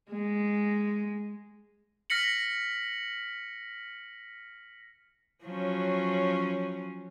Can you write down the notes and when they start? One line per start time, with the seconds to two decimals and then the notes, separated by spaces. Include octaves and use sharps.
0.11 G#3
2.10 F6 A#6 B6 C#7 F#7
5.43 F3 F#3 C#4